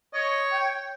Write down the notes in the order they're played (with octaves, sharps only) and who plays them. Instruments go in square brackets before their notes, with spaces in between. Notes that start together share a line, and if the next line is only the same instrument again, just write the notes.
[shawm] C#5 [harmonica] D#5
[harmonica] G5